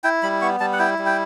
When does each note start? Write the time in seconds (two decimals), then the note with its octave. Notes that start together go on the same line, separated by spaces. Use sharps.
0.04 E4 G5
0.23 G3 B5
0.41 B3 C#6
0.60 G3 A5
0.73 F#5
0.79 E4 G5
0.99 G3
1.06 G5